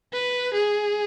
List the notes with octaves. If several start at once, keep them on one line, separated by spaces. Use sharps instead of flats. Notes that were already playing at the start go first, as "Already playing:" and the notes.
B4
G#4